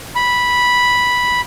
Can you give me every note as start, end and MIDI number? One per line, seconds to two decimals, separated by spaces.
0.15 1.41 83